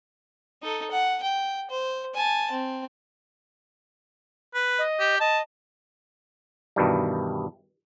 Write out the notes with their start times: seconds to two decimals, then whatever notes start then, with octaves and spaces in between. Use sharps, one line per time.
0.63 D#4 A4
0.91 F#5
1.23 G5
1.71 C5
2.15 G#5 A5
2.51 C4
4.55 B4
4.79 D#5
5.00 G4
5.20 D#5 A5
6.76 G2 B2 D#3 E3 G3